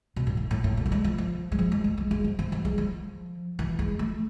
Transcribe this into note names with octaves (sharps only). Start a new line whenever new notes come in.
B2
A2
G#2
A2
A2
B2
A3
G#3
F3
F3
G#3
F3
G#3
G#3
G#3
G#3
F3
F3
E3
G#3
F3
E3
G#3
A3